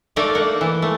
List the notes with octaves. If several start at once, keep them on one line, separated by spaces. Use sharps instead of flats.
A3 A#3 D#4 A#4 D5
A#3 F#5
E3
A3